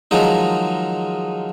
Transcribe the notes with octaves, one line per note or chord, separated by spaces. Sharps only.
D#3 F3 F#3 G#3 D#4